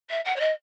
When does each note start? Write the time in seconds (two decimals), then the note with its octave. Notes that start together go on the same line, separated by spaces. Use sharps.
0.09 E5
0.24 F#5
0.36 C#5
0.40 D#5